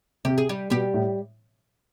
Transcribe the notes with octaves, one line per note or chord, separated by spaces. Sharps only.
C3 G4
G#4
G3 G4
B2 G3 G4
A2